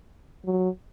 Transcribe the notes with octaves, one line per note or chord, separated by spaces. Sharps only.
F#3